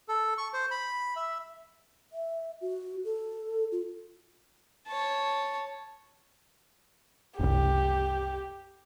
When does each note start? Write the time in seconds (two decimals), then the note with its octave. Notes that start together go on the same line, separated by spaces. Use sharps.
0.08 A4
0.38 C#6
0.54 C5
0.71 B5
1.16 E5
2.13 E5
2.61 F#4
3.04 A4
3.72 F4
4.87 C#5 A5
7.39 F#1 C2 G4